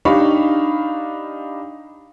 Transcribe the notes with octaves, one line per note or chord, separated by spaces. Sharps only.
D4 D#4 G4 F5 B5 C#6